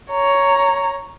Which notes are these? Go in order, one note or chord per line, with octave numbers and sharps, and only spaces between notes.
C#5 A#5